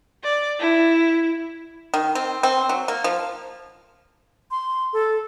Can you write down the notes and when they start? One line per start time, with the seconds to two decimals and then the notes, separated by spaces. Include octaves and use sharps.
0.24 D5
0.60 E4
1.94 D#3
2.15 C4
2.43 C4
2.69 F#3
2.88 A#3
3.04 F3
4.51 C6
4.93 A4